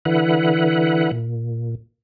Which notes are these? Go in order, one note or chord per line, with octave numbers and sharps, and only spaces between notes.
D3 E3 E4 B4 F#5
A#2